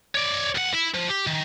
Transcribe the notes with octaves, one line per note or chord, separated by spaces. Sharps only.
C#5 D5
C2 F#5
E4 E5
F3
G4
D#3